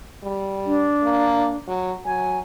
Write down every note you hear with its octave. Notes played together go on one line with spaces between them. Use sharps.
G3
D4
A#3
F#3
F#3 G#5